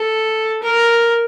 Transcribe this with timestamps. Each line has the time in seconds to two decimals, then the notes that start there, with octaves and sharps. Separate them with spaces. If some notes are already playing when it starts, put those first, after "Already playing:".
Already playing: A4
0.62 A#4